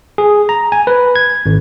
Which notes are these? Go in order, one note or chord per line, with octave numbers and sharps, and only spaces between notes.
G#4
A#5
G#5
B4
G#6
G#1